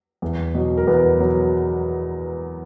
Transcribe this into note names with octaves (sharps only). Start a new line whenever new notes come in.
E2
B2 F#3
A#4
E2 B3 B4
B2 F#3